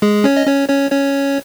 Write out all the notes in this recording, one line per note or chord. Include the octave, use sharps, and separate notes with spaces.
G#3 G#4
C#4 C#5
D#5
C#4 C#5
C#4 C#5
C#4 C#5